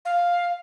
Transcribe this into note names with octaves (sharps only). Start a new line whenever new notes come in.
F5